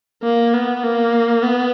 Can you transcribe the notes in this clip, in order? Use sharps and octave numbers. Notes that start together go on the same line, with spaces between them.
A#3
B3
A#3
B3